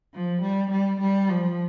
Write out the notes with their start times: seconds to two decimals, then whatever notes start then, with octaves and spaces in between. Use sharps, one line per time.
0.14 F3
0.42 G3
0.71 G3
1.01 G3
1.29 F3